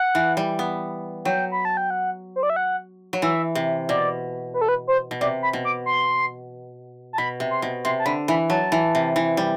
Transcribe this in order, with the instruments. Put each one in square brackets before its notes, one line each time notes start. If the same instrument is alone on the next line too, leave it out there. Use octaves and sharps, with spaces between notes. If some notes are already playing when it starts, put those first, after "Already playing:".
Already playing: [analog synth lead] F#5
[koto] E3
G3
B3
[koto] F#3 [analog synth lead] G5
[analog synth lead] B5
A5
G5
F#5
C5
D5
E5
F#5
[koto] F#3
[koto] E3 [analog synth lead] E5
[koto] C3
[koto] B2 [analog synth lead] D5
[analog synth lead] B4
A4
B4
C5
[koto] B2
[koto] C3 [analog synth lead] D5
[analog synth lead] B5
[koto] B2
[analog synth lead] D6
C6
A5
[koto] B2 [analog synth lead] B5
[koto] C3
[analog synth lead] C6
[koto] B2
[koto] C3 [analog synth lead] C6
[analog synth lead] A5
[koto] D3 [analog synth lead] B5
[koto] E3 [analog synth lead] B5
[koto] F#3 [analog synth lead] A5
[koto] E3
C3
E3
G3